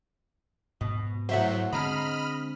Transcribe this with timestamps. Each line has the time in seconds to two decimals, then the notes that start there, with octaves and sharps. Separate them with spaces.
0.81 G#2 B2 B3
1.29 A2 F#3 C5 E5 F#5
1.73 D3 G#3 C4 D#5 A#5 B5 F6